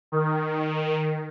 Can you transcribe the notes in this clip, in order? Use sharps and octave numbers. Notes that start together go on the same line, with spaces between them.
D#3